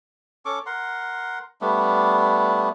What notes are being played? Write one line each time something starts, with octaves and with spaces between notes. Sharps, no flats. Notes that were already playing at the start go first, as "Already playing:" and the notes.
C#4 A4 C#6 D6
A#4 F#5 C6
G3 A3 B3 D4